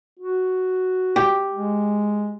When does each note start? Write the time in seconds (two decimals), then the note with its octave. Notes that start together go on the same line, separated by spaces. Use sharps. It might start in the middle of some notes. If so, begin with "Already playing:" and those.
0.19 F#4
1.16 G4
1.54 G#3